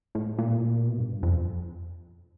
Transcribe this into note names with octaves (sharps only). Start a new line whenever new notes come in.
A2
A#2
B2
G2
F2